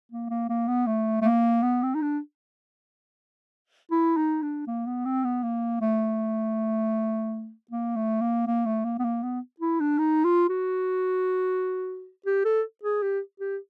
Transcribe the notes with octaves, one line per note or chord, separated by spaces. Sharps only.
A#3
A#3
A#3
B3
A3
A3
A#3
B3
C4
D#4
D4
E4
D#4
D4
A#3
B3
C4
B3
A#3
A3
A#3
A3
A#3
A#3
A3
A#3
B3
A#3
B3
E4
D4
D#4
F4
F#4
G4
A4
G#4
G4
G4